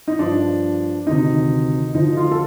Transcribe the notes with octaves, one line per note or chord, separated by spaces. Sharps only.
D#4
G2 F3 D4
D2 C3 D#3 D#4
D2 D3 F3 D#4
F4
A4